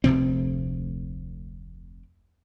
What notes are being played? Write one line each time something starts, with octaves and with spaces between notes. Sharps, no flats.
F1 D2 C3 C4